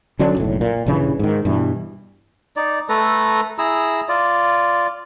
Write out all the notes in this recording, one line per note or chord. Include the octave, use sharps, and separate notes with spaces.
D3 F#3 C#4 D4
F#1 B1 A2
A#2
A#1 G2 C#3 E3
G#2 D#3
G2 B2 E3
D#4 D5
A3 A4 B4 A#5
E4 G#4 A#5 E6
F4 D5